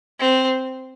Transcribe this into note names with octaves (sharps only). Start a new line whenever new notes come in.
C4